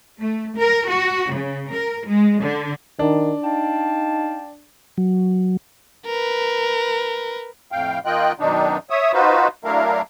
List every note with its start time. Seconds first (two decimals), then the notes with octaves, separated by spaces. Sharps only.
0.20 A3
0.56 A#4
0.89 F#4
1.31 C#3
1.72 A#4
2.08 G#3
2.40 D3
2.99 D#3 D4
3.44 D#4 F5 G5 A5
4.98 F#3
6.06 A#4 B4
7.72 F2 A2 F5 G5
8.05 D#3 A#3 F4 D#5 G5 F#6
8.40 F#2 B2 D#3 D4 D#4
8.90 C#5 E5 D#6
9.13 D#4 F4 F#4 B4 C5
9.65 F#3 A3 D4 E4 A#4 F5